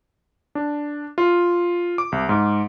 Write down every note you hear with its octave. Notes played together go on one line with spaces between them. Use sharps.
D4
F4
D6
C2
G#2